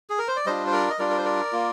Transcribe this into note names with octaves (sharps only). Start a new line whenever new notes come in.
G#4
A#4
C5
D5
G3 D4 F4 C5 D#5
C5
A#4 D5
D#5
G3 D4 F4 A#4 D5
A#4
C5
A#4 D5
A#3 F4